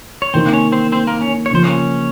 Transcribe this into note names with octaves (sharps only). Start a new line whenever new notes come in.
C#5
C3 D#3 A#3 C4 D#4 C5
C#4 C#5
C4 C5
C4 C5
A#3 A#4
C#4 C#5
C#5
C#3 F3 A#3 C5
C#4 C#5